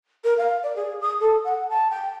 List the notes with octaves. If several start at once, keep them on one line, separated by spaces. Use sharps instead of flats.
A#4
F5
D5
G#4
D#6
A4
F#5
A5
G5